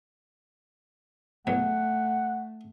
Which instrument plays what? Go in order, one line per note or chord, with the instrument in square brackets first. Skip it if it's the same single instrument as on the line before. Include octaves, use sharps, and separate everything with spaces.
[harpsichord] E2 B2 F#3 [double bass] A3 [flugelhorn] F#5